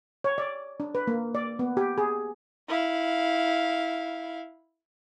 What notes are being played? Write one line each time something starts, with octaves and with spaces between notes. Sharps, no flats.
C#5
D5
D4
B4
A#3
D5
B3
G4
G#4
E4 F5